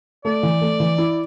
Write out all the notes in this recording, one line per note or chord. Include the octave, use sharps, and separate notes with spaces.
A3 D5
E3
A3
E3
E4